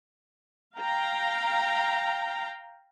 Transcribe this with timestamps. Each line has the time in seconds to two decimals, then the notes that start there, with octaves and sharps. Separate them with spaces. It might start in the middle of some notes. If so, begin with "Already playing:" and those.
0.77 F5 G5 A#5